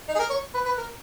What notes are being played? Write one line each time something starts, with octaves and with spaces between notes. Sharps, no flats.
D#4
G#4
A#4
C#5
B4
B4
A#4